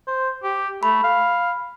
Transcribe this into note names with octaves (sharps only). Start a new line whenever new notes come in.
C5
G4
A3 B5
F5